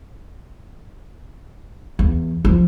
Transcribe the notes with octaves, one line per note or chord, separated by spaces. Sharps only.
E2
F3